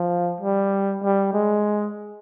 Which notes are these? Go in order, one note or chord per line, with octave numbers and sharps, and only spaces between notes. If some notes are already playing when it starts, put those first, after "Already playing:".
Already playing: F3
G3
G3
G#3